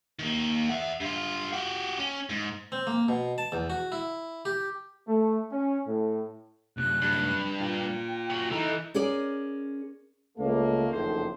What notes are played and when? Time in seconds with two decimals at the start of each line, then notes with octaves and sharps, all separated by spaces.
0.19 D#3 A#3
0.69 E5 F#5
1.00 G2 F4
1.53 F#4 G4
1.99 C#4
2.29 G#2
2.72 C4
2.87 A#3
3.08 B2
3.38 A5
3.52 E2
3.70 F#4
3.92 E4
4.45 G4
5.07 A3
5.51 C#4
5.86 A2
6.77 F#2 C3 F#6
7.02 G2
7.61 F4 A#4 G5
8.30 C#4 F#4
8.51 E3 D#4 A4 A#5
8.94 C#4 G#4 A#4 D5
10.37 C#2 A3 A#3
10.90 F#1 F2 A2 D#3 G#4 C5